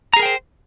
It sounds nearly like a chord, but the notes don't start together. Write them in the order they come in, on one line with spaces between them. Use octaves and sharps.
A#5 G#4 A#4 G5 C5